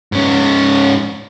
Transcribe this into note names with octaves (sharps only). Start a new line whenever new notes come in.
G#2 C#4